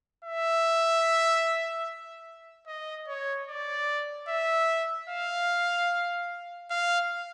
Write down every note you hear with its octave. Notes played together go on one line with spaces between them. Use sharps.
E5
D#5
C#5
D5
E5
F5
F5